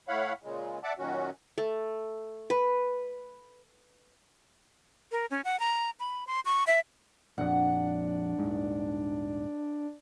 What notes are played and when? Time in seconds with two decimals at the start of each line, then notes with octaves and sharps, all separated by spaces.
0.08 A2 E4 C#5 F5 F#5 B5
0.43 A#2 C#3 G#3
0.83 D5 E5 F#5 A5 D6
0.99 F#2 A#2 D#3 C#4 F#4
1.58 A3
2.50 B4
5.12 A#4
5.31 C#4
5.45 F#5
5.60 A#5
6.00 B5
6.27 C6
6.45 C#6
6.67 E5
7.38 A#1 F2 D4 F#5
8.39 D#1 G#2